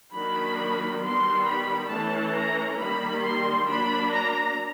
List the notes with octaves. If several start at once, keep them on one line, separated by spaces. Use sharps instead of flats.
D#3 F#3 A#3 D4 B5
D#3 G3 B3 C6
B5
E3 A3 C#4 A5
A#5
D#3 G3 A#3 B5
C6
F#3 A#3 D4 B5
A#5